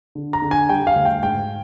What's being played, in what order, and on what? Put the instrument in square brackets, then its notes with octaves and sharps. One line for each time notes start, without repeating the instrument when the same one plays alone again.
[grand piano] D3
A#5
D3
G#5
G3 G5
F5
D2
G5
G#2 G5